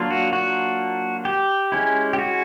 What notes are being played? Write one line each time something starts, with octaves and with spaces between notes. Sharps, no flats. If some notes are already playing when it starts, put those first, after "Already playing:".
Already playing: F#3 A#3 D4 F4
F#4
F#4
G4
G#3 C#4 E4
G4
F#4